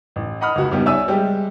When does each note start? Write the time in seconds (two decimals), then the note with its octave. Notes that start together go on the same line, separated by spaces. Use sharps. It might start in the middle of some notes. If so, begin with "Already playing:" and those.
0.16 A1
0.41 D#5 F#5 B5 D#6 F6
0.56 C#2 F#4
0.71 C#2 G#2 G3 B3
0.86 C#5 D5 E5 G#5 E6
1.08 G3 G#3 G4